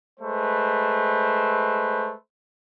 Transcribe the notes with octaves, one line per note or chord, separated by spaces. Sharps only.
G#3 A3 B4 C5